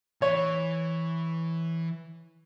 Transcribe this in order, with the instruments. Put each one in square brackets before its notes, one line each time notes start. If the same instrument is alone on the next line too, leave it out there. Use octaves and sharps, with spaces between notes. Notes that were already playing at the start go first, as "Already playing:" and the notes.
[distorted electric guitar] E3 [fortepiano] C#5